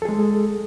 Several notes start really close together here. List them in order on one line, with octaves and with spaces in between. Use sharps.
A4 G#4 G#3